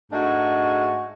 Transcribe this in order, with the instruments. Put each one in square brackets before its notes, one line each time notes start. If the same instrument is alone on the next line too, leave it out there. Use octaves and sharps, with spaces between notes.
[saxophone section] G#2 G#3 A3 D4 F#4